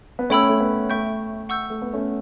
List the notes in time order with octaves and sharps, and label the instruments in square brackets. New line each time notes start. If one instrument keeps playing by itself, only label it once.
[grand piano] B3
[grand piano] A3 C#4 [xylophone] C#5 G5 B5 E6
[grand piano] A3
B3
[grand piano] A3 [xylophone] E5 G5 C#6 G6
[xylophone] F#5 C#6 E6 G6
[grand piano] A3
B3
A3 C#4